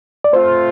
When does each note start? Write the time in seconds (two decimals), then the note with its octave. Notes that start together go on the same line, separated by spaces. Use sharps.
0.24 D5
0.33 A3 C4 F4 C5